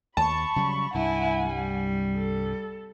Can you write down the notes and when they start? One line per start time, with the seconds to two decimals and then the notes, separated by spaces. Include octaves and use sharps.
0.17 D#2 A5 B5 C#6
0.56 C#3 F#3 G3
0.94 C2 G2 E4 F#5 G#5
1.45 G3
2.17 A4